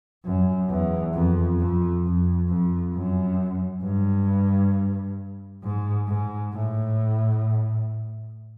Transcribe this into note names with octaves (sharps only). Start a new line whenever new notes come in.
F#2
E2
F2
F2
F2
F2
F#2
G2
G#2
G#2
A2